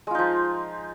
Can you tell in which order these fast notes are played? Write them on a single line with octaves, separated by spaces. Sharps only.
G#3 F4 D#4 F3